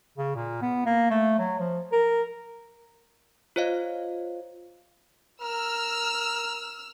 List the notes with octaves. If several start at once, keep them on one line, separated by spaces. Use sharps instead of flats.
C#3
A#2
B3
A#3
A3
F#3
F3
A#4
F4 C5 C#5 D#5 F5
A#4 E6 F6